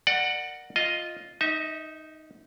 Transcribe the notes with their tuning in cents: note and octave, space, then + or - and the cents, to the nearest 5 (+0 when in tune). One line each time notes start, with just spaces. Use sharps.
A#4 +0 D5 +25 F#5 +0
F4 +0 D#5 +0
D#4 +0 E5 -30